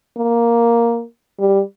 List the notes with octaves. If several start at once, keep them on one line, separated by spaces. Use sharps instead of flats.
A#3
G3